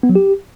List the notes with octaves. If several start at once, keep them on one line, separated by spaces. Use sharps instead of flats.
B3
F#3
G4